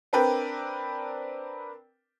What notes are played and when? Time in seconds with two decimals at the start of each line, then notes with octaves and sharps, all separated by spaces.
0.13 C4 D4 A#4 B4 D5 G5